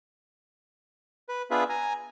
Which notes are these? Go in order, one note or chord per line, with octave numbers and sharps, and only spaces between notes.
B4
B3 D4 F4 G#4 B4 E5
G#5 A#5